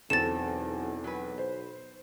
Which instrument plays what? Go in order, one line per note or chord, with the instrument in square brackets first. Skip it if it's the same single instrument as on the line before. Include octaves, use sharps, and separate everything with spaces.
[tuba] B1 [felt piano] E2 C4 [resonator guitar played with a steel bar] A4 [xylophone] A6 E7
[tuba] B1 [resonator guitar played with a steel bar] F#3 B4
[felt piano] C5